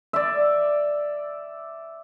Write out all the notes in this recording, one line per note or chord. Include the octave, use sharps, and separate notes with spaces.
D5 E5